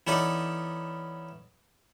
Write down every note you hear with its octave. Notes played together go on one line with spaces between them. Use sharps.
E3 B3 C#4 D#4 A4 D5